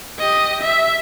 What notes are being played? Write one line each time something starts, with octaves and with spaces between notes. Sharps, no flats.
G4 D#5
E5